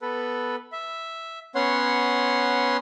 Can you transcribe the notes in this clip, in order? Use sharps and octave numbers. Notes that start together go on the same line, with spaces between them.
B3 A4 B4
E5
B3 C#4 C#5 F#5 C6